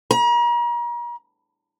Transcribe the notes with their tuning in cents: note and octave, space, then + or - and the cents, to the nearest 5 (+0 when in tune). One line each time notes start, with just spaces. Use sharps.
A#5 +40